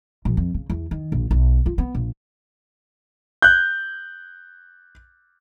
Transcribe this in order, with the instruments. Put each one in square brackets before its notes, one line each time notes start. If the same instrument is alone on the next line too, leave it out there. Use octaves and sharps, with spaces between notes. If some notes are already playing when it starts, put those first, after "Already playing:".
[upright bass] A#1
F2
C#3
E2
D#3
A#1
B1
F4
B3
A#1
[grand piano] F#6 G6